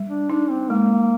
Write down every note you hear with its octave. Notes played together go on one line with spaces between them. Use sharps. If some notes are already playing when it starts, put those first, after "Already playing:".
Already playing: G3
D4
D4 D#4
C4
G#3 A#3